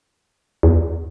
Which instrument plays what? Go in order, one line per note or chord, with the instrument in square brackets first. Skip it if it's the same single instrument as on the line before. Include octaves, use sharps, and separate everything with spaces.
[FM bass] E2